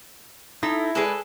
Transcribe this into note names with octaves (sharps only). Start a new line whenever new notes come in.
D#4 E4 A4
G#3 G#4 A4 B4 D5